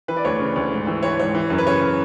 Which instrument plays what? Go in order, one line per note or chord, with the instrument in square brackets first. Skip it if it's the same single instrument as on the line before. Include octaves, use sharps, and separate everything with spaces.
[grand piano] E3 B4
D5
D2 C#5
C#3
D2
G#2
E3
E3 C#5
G#2 C#5
E3
F#2
B4
C#3 C#5